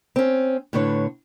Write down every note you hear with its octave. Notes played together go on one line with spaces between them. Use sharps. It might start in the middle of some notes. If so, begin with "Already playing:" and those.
C4 C#4
A2 D3 B4 C#5